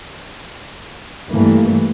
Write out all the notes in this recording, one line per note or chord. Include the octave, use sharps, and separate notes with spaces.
G2 E3 A3 A#3